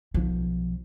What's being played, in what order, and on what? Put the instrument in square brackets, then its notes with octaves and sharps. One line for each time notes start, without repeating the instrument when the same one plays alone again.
[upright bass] B1 F3